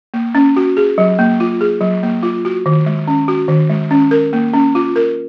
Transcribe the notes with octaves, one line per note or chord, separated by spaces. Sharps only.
A#3
C#4
F#4
G#4
F#3
A#3
F4
G#4
F#3
A#3
F4
F#4
D#3
G#3
C#4
F#4
D#3
G#3
C#4
A#4
A#3
C#4
F4
A#4